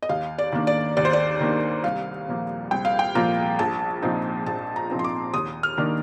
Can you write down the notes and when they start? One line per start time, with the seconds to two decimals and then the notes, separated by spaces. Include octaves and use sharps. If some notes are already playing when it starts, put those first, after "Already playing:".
0.03 D#5
0.09 D#2 F5
0.38 D5
0.52 D#3 A#3 D4
0.67 D5
0.97 D#2 D5
1.05 C5
1.13 D5
1.40 D#3 A#3 D4
1.84 C2 F5
2.28 A#2 F3 A#3
2.71 C2 G5
2.85 F5
2.99 G5
3.15 A#2 F3 A#3 A#5
3.59 A#1 A5
4.02 A#2 F3 C4 D#4
4.46 A#1 A5
4.76 A#5
4.90 A#2 F3 C4 D#4
4.99 C6
5.04 D6
5.34 D#2 D#6
5.63 F6
5.77 D#3 A#3 D4